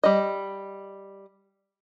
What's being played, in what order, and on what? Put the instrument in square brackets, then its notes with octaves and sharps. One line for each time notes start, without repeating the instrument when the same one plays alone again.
[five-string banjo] G3 D#5